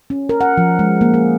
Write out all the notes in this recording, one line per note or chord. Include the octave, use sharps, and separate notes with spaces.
C#4
A#4
F#5
F3
G#3
A#3
G#4